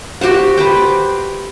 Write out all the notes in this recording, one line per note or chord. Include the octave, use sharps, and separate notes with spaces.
F#4 G4 C5 F#5
B4 C5 G5